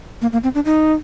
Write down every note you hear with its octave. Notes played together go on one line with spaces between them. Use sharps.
A#3
A#3
C4
D4
D#4